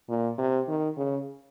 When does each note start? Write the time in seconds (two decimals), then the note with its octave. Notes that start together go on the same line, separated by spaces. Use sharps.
0.09 A#2
0.38 C3
0.68 D#3
0.97 C#3